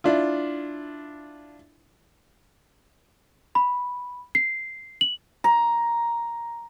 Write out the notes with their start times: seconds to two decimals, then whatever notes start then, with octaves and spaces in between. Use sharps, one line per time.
0.04 D4 E4 F4
3.55 B5
4.35 C7
5.01 F#7
5.44 A#5